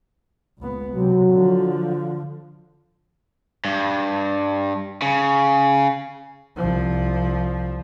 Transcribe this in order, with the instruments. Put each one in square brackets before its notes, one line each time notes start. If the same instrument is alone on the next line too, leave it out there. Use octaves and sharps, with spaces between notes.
[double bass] C#2 B3
[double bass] C3 [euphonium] F#3
[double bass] D3 F3
[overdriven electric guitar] G2
C#3
[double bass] C2 F3